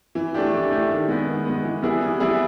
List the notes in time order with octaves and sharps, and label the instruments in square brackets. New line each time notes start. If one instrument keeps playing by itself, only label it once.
[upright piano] E3
A3 D4 G4
E3
A3 D4 G4
D#3
G#3 B3
D#3
G#3 B3
E3
G3 B3 E4 G#4
E3
G3 B3 E4 G#4